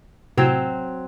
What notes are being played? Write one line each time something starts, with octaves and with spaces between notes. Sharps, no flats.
A2 C3 F#3 C4 G#6